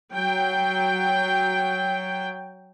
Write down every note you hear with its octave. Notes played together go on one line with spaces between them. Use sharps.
F#3 G5